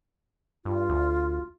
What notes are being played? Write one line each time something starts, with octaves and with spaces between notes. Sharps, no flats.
G2 F4
D2